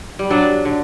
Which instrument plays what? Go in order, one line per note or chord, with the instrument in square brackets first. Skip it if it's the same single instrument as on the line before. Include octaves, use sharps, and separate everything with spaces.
[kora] G3
[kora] F#3 [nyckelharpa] D4
[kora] D3